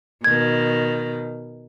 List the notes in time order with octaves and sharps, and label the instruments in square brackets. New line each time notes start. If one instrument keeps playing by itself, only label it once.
[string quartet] B2 D#3 [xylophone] G#6